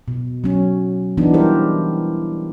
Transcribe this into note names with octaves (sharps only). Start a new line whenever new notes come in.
B2
F#3 C#4
E3 B3 D4 D#4
G3 G4 A#4 C5